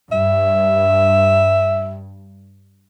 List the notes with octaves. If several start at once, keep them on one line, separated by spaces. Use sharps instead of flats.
G2 E5